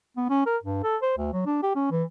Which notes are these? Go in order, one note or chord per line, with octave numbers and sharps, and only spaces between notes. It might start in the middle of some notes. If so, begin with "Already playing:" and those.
B3
C#4
A#4
G2
A4
C5
D2
F#3
D4
G4
C#4
E3